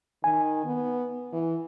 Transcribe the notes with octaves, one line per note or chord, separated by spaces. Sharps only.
D#3 G#5
B3
E3